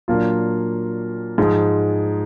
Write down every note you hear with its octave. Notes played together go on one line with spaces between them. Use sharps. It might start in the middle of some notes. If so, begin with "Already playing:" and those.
A#2 F#3 A#3 D4 F4
G#2 F3 G#3